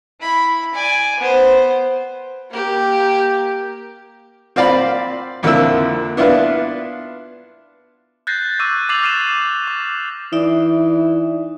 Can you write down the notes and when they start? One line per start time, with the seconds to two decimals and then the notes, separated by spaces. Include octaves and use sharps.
0.20 E4 B5
0.74 D5 G#5
1.19 B3 C5
2.51 A#3 G4
4.56 C4 F4 D5 F5 B5
5.43 F2 D3 F3 A#3 E4 E6
6.17 B3 D4 E4 F4 B4
8.27 F#6 G6 A6 A#6 C7
8.59 C#6 D6 E6 D#7
8.89 D6 A6 C7 F7 F#7
9.03 F6 C7 D#7 E7
9.68 D6
10.33 E3 D#4 D5 E5